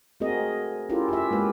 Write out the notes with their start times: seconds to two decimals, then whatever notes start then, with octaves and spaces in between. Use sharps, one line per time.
0.20 A3 C4 F#4 G#4 A#4 D#5
0.89 C#4 E4 F4 G4 A4 A#4
1.09 F4 G4 E5
1.31 G#3 A#3 G4 B4